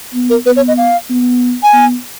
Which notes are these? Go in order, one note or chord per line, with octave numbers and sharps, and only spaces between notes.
B3
A#4
B3 B4
C#5
D#5
F5
B3
G#5
B3